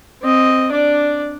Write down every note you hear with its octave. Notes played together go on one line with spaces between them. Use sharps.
C4 D#5
D4 D5